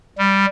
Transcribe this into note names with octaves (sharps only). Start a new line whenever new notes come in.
G3